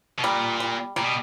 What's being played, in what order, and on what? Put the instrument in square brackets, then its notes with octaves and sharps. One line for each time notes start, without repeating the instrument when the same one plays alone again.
[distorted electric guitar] B2
[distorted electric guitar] A#2 [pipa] G3
[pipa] G3
[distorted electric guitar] A#2 [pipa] G3
[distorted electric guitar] B2